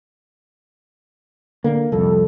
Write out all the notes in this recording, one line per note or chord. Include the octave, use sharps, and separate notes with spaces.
D3 A#3
C2 F2 A4